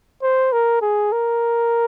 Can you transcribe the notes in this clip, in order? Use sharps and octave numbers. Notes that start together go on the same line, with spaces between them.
C5
A#4
G#4
A#4